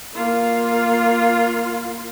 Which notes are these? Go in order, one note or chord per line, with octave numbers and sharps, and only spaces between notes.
A#3 F4